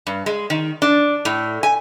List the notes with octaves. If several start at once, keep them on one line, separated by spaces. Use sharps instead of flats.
G2
G#3
D#3
D4
A2
G#5